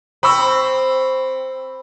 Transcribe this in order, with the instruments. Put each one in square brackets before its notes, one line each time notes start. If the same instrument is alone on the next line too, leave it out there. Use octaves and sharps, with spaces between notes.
[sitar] C4 [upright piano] B5 C#6 E6